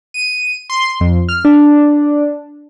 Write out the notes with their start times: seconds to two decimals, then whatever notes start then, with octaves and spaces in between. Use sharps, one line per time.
0.14 D#7
0.70 C6
1.00 F2
1.29 F6
1.45 D4